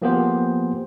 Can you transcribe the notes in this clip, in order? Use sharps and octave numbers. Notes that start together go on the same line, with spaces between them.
F3 A#3 B3 G4 G#4 C5